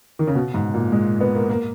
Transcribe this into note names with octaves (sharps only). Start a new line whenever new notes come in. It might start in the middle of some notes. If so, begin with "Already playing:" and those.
D#3
C#3
B2
G#2
A#2
G#3
B3
A#3
A#3